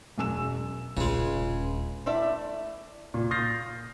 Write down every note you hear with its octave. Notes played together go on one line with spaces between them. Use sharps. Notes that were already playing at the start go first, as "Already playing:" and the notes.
E1 F#2 G#5 E6 E7
D#1 C#2 C#3 G#3 D4
A3 E4 D5 E5
A#2
D#6 F6 G6 A6 A#6 C7